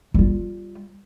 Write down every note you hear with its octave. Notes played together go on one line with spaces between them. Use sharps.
G3 F4